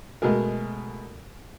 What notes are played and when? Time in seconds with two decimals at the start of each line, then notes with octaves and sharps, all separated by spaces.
0.22 B2 G#3 A3 G#4 A#4